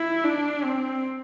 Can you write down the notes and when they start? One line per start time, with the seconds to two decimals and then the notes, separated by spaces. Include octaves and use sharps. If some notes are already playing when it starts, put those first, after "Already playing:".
Already playing: E4
0.24 D4
0.64 C4